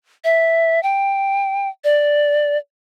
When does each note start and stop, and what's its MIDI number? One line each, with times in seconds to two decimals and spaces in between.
0.24 0.82 76
0.83 1.68 79
1.84 2.58 74